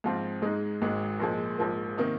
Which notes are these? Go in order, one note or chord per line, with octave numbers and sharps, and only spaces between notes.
G#2 F3 C4 F4
G#2 G#3 D#4
G#1 G#2 G#3
A#1 A#2 F3 G#3
A#1 G#2 F3 A#3
C3 D#3 A#3 D#4